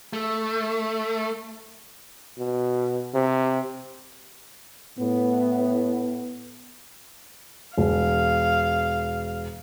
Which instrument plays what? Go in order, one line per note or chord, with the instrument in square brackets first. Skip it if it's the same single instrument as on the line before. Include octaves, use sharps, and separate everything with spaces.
[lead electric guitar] A3
[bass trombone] B2
C3
[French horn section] A2 B3
[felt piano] E1 [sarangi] F5